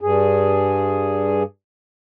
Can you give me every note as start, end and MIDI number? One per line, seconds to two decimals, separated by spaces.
0.01 1.43 43
0.01 1.43 68